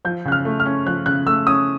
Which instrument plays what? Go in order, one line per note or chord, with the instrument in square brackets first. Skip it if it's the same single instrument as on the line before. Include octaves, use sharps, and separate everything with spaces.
[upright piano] F3 [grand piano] G6
[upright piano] C#3 [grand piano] F#6
[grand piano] F6
[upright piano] A3
[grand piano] F6
[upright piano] C#4
[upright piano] F3 [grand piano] F#6
[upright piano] C#3 [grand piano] F#6
[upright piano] A3 [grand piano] E6
[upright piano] C#4 [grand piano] D#6